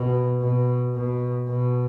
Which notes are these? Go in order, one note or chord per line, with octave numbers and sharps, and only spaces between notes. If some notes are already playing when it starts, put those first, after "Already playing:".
Already playing: B2
B2
B2
B2